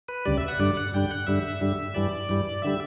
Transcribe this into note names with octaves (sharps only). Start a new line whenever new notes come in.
B4
D2 C#3 G3 D5
E5
F#5
G2 D3 G3 D5
F#5
G2 D3 G3 G5
F#5
G2 D3 G3 E5
G2 D3 G3
G2 E3 G3 D5
G2 E3 G3
D3 G3 E5